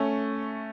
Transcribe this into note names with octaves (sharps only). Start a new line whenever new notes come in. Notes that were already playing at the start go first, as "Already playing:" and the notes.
Already playing: A3 C#4